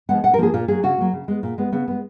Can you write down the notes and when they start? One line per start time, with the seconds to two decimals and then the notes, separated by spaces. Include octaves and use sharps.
0.09 F3 G#3 B3 F#5
0.23 A#2 F#5
0.34 A#4
0.38 F3 A#3 G#4
0.53 A#2 F4
0.68 F#3 A#3 G#4
0.83 C#3 F#4
0.98 F#3 A#3
1.13 C#3
1.28 G#3 B3
1.43 A#2
1.58 G#3 B3
1.72 C#3 B3
1.88 G#3 B3